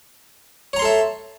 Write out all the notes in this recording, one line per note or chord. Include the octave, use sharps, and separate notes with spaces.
A4 C#5 E5 A#5 C6